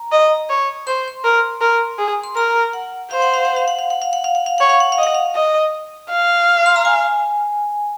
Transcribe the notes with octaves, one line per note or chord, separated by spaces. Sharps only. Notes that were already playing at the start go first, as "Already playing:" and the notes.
Already playing: A#5
D#5
C#5
C5 C6
C6
A#4
A#4
G#4
C6
A#4 A#5
F#5
C5 F5
F#5
F5
F#5
F5
F#5
F5
F#5
F5
F#5
F5
F#5
F5
C#5 F#5
F5
F#5
F5
D#5
F#5
F5
D#5
F5
C6
A#5
G#5